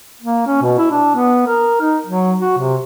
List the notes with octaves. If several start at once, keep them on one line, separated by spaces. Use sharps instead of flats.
A#3
C#4
B2
E4
D4
B3
A#4
D#4
F#3
F#4
C3